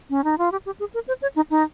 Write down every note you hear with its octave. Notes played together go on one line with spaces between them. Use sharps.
C#4
D#4
F4
G4
G4
G#4
A#4
C5
C#5
D#4
D#4